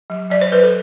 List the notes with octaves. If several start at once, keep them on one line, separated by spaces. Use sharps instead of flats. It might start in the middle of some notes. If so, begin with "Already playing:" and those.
F#3
F#3 D5
C5
F#3 B4
A4